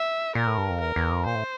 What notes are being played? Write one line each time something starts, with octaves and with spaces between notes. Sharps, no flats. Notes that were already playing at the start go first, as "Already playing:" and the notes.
Already playing: E5
A#2 A#4
A2
G2
F2
E2 A#4
E2
F2
A#2 C5
A2